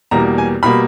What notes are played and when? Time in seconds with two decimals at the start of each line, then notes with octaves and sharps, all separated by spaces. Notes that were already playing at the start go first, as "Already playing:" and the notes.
0.11 E2 B2 G3 A#3 A#5
0.38 G#5
0.63 B2 G3 A#3 B5